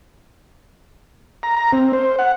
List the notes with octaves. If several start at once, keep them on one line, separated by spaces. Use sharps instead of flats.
A#5
A#5
C4
C5
F#5